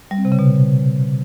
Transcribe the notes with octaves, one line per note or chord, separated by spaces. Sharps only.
G3
C4
C3
C#3
B2